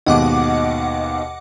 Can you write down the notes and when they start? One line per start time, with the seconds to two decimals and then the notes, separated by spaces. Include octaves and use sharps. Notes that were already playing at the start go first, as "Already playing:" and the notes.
0.07 D#2 G#2 B2 D#5 F#5 D6